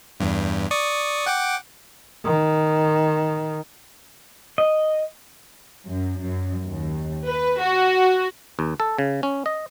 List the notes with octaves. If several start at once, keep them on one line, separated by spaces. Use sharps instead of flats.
E2 G2
D5 C#6 D#6
F#5 G5 D6
D#3
D#5
F#2
F#2
D#2
B4
F#4
D#2
A4
C#3
C#4
D#5